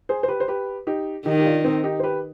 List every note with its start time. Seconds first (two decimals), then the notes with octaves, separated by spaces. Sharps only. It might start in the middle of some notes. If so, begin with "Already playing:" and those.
0.09 G#4 C5
0.23 C5
0.28 G4 B4
0.40 C5
0.48 G4 B4
0.87 D#4 G4
1.26 D#3 D#4 G4
1.39 G4
1.45 D4 F4
1.64 C4 D#4
1.84 D#4 G4
2.00 C5
2.03 G4 B4